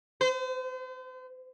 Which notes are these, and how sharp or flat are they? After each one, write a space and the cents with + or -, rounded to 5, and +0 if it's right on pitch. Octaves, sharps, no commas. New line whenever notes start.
C5 -40